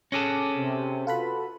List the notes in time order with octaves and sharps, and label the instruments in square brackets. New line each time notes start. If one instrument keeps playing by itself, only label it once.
[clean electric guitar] C#4 G#4 A4 [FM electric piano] D6 F#6 A#6
[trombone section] C3
[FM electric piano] F4 B4 B5 [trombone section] F#4 A4